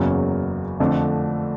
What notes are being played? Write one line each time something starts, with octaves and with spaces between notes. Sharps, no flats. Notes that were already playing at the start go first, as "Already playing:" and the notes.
Already playing: F#1 E2 C#3 F#3 A#3
F2 D3 F3 A3 D4